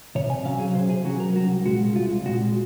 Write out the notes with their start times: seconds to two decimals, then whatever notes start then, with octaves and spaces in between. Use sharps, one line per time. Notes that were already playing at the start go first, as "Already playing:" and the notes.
0.15 C3 C#5
0.30 G#5
0.45 F#3 C#4 F5
0.59 G#4
0.75 C3 C5
0.90 G#4
1.05 F#3 C#4 F#4
1.20 A#4
1.35 C2 F#4
1.65 A#2 G#3 F#4
1.95 C2 F4
2.25 A#2 G#3 F#4